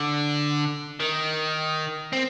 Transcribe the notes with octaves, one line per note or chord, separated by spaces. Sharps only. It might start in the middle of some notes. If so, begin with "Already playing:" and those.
Already playing: D3
D#3
C4